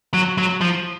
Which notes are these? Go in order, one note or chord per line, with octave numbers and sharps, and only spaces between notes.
F#3
F#3
F3